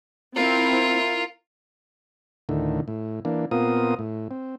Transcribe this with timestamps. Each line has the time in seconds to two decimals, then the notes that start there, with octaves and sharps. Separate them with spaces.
0.36 C4 E4 F4 A#4
2.49 D2 A2 D3 D#3
2.88 A2
3.25 E3 A#3 D4
3.51 A#2 B3 C4 F4 A#4 D#6
3.99 A2
4.31 C4